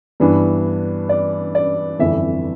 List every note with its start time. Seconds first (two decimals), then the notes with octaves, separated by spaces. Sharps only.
0.20 G2 E3 B3 D4
1.09 D5
1.55 D5
1.99 G1 F2 E3 E5